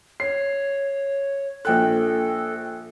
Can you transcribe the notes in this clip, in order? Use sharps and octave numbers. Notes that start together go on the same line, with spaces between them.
C#5 C7
A#1 A4 G5 F#6